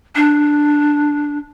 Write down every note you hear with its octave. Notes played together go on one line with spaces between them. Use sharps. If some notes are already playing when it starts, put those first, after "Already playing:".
D4